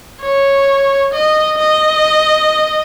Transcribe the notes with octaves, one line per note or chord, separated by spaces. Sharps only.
C#5
D#5
D#5